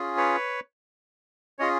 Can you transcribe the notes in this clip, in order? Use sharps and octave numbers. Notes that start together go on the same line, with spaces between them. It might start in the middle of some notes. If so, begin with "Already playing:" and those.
Already playing: C#4 F4 G#4
B4 C#5
C#4 F4 G#4 C#5 D#5